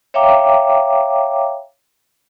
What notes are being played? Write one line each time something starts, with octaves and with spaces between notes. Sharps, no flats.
C#5 E5 F5 G5 A#5 D6